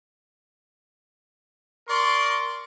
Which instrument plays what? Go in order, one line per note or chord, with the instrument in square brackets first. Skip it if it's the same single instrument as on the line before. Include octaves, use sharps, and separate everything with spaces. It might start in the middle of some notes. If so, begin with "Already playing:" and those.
[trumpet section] A#4 D5 C6 C#6